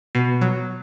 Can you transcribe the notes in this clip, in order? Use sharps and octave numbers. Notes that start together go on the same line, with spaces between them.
B2
F#3